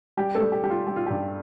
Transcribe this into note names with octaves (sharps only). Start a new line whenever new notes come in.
G3 G4
A3 A4
G3
G4
G3 G4
F4
G3 G4
F4
G2 G4